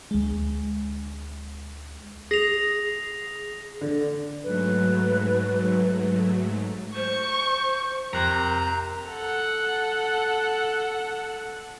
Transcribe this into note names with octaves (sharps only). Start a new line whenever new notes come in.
D2 G#3
G#4 A#6 F7
D3
G#2 F#3 A3 B4
C5 C#6
F2 C3 A#4 A#5 F#6
A4 F#5